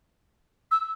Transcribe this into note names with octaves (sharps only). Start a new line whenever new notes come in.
E6